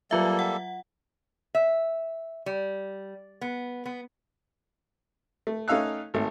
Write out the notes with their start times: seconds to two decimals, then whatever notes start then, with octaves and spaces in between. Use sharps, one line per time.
0.11 F#3 G3 A#3 F4 A4 E5
0.39 F#5
1.55 E5
2.46 G3
3.41 B3
3.85 B3
5.47 A3
5.68 A3 C#4 D#4 F5 E6 F#6
6.14 G#1 A3